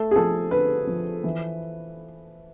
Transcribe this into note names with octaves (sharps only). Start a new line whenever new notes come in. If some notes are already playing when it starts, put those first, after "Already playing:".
Already playing: A3 A4
G#4
F3 A4
D3 B4
F3
E3